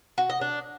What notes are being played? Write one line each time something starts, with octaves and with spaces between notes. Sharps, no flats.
F#4
D#5
D4